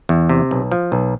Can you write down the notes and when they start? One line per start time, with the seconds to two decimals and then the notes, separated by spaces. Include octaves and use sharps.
0.09 E2
0.29 C3
0.51 B1
0.72 F3
0.92 B1